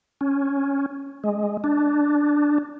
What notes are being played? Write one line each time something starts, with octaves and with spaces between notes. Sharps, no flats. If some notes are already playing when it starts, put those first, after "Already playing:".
C#4
G#3
D4